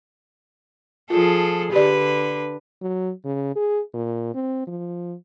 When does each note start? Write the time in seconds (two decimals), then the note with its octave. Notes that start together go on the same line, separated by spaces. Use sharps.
1.10 F3 F4 G#4 A4
1.72 D3 G4 B4 D5
2.82 F#3
3.25 C#3
3.56 G#4
3.94 A#2
4.34 C4
4.67 F3